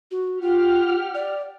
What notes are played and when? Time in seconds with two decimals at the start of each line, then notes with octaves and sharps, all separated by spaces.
0.11 F#4
0.41 F4 G4 F#5 F6
1.15 D5